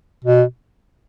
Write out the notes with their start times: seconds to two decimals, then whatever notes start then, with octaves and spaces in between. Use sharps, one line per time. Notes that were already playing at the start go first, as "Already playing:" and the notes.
0.24 B2